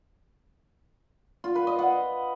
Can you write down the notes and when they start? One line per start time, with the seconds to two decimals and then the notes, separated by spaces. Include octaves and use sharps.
1.44 F4
1.55 B4
1.67 D#5
1.79 F#5